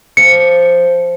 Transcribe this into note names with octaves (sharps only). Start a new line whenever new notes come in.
F3 C#7